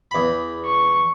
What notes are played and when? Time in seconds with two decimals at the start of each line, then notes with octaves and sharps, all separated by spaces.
0.11 E2 B5
0.65 C#6